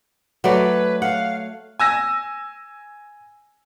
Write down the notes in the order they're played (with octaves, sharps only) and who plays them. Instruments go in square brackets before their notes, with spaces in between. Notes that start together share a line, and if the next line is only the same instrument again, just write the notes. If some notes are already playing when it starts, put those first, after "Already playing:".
[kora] F#3 A3 D5 [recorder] B4
[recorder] F5 [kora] F#5
[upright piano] G#5 E6 A#6